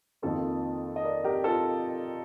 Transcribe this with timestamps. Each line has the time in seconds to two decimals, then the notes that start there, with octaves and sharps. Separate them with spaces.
0.22 F2 D#3 A#3 F4 A4
0.96 D#5
1.04 A#4 D5
1.24 G4 A#4
1.44 F4 A4